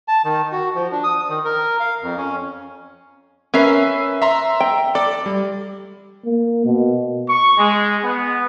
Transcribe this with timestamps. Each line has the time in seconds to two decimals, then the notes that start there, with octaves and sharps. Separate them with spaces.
0.08 A5
0.24 D#3
0.52 F#4
0.75 F3
0.92 D4
1.04 D#6
1.29 D#3
1.44 A#4
1.80 F5
2.02 F2
2.17 C#4
3.54 C#4 A#4 B4 E5 C7
4.22 E5 A#5 C6
4.60 G5
4.95 A4 D5
5.26 G3
6.25 A#3
6.65 B2
7.29 C#6
7.58 G#3
8.04 B3